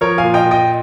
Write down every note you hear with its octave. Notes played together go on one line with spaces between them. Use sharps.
F3 A#4 C#5
F5 G#5
A#2
D#5 G5
A#2
D#5 G5